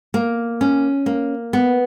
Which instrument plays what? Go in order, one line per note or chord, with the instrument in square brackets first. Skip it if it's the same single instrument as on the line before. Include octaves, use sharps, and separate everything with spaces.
[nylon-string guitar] A#3
C#4
A#3
B3